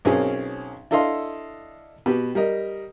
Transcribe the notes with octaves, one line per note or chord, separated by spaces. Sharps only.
B1 C4 C#4 G#4 A#4
D4 E4 A4 D#5 F5 C6
B2 G4 B4
G3 A#4 D#5